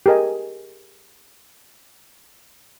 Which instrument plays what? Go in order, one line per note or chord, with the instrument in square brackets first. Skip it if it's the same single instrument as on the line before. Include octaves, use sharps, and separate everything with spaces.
[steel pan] G4 G#4 A#4 D#5 G#5